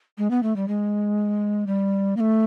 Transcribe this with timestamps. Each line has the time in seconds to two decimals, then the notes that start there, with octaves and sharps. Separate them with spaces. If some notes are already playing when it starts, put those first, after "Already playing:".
0.18 G#3
0.31 B3
0.43 A3
0.56 G3
0.68 G#3
1.67 G3
2.17 A#3
2.20 A3